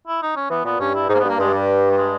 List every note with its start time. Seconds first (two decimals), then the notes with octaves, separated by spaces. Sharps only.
0.08 E4
0.22 D#4
0.36 C#4
0.50 E3 B3
0.65 A#2 B3
0.80 G2 C#4
0.95 E4
1.09 G#2 D#4
1.14 A#3
1.19 B3
1.24 G2
1.29 A#3
1.39 G2 G#3
1.54 G3
1.91 G3
1.98 G#3